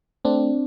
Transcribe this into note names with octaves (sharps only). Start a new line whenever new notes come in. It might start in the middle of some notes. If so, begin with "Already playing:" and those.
A3 C4 D4